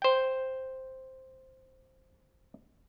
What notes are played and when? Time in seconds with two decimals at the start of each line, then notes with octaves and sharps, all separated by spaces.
0.02 C5 G5